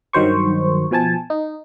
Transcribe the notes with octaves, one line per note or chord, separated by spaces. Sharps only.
G2 D#3 F#3 C5 C#6
B2 F3 G#5 A5
D#4